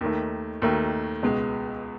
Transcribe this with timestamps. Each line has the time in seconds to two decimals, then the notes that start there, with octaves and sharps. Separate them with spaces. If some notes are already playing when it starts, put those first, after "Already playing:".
0.01 D#2 D#3 A3
0.62 D#2 D#3 A3
1.23 C#2 B2 G#3